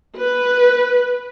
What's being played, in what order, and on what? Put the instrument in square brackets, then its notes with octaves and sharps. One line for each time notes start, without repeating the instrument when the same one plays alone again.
[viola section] B4